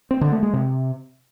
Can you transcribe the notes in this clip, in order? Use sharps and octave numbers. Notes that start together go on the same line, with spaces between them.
C4
D3
A3
G#3
C3